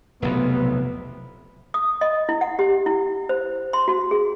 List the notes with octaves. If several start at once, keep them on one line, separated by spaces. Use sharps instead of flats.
F1 B1 E2 C3 B3
D#6
D#5
E4
F#5
G4
E4
C5
C6
F#4
G#4